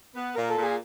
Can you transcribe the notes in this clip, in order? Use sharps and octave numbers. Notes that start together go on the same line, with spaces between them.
B3
A#2 A#4
A4
A#2
G#4